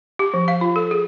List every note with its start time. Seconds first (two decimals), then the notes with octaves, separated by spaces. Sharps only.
0.19 G4
0.34 F3
0.48 F5
0.61 F4
0.76 A4
0.91 G#4